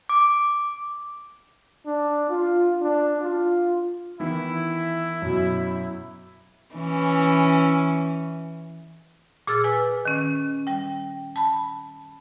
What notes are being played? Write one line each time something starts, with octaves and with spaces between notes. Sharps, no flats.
D6
D4
F4
D4
F4
D#3 E3 B3 E4
F#2 B2
E3 C#4
A#2 G#4 E6 F6 A6
B4 G#5
D#3 C#4
G3 G5
A5 B5